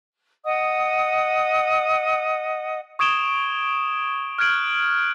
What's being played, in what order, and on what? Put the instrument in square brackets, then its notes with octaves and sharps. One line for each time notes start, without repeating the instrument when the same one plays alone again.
[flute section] D#5 F#5 D#6
[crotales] C#6 D#6 G#6 D7 E7 G7
F6 F#6 G#6 D7 F#7